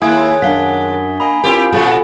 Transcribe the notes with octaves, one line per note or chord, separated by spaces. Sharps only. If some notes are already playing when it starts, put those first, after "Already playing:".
D#2 G#3 A#3 E4 G#5 D#6 G#6
F#2 D4 F5 F#5 B6 G7
A#3 D#5 G#5 B5
C4 E4 F4 G4 A#4
A#2 F3 C#4 F4 F#4 A4